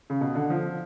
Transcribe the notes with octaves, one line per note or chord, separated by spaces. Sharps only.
C#3
B2
D3
F3